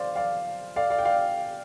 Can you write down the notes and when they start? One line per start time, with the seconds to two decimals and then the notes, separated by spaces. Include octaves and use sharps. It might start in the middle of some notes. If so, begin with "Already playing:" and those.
Already playing: C5 D5 F5
0.16 D5 F5
0.76 D5 F5
0.90 D5 F5
0.98 G5
1.05 D5 F5